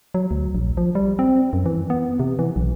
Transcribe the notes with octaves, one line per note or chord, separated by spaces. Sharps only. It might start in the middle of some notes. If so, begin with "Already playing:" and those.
F#3
D2
A#1
F3
G3
C4
F#2
E3
B3
C3
E3
B1